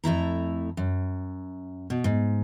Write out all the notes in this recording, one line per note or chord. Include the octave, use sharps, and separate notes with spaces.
F2 A3 E4 A#5
F#2
B2
G#2